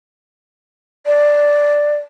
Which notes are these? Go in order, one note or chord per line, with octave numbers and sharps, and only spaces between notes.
D5